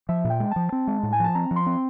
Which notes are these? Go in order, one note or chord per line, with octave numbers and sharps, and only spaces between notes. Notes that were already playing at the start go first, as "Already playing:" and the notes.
F3 E5
A#2
G5
G#3
F3 A5
C4
G#3
A2
G#5
F3 A5
C4 A#5
F3
C6
C4